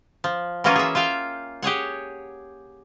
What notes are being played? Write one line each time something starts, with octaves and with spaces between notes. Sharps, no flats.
F3
E3 F#3 A#3 C#4 F4 G#5
G#4 E5
F4 E5 F5 G5
G4 G#4 C#5 F#5